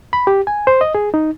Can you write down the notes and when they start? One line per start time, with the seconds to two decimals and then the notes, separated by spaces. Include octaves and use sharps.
0.13 B5
0.27 G4
0.47 G#5
0.67 C5
0.81 D#5
0.95 G#4
1.14 D#4